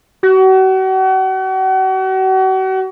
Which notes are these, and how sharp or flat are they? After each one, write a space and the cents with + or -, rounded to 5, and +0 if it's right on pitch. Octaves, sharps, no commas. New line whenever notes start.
F#4 +40